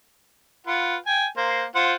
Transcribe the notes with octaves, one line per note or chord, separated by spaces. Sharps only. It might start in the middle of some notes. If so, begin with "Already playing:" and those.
F4 B4 F#5
G5 G#5
A#3 C5
F4 C5 F#5